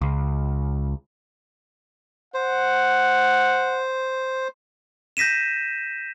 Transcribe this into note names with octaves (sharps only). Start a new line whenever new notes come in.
C#2
C5 F#5
G6 A#6 B6 D#7 E7